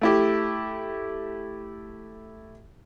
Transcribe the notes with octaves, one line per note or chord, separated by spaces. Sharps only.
A3 E4 G4